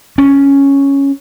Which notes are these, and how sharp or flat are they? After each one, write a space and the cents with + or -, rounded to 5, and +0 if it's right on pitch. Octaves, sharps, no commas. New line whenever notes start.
C#4 +0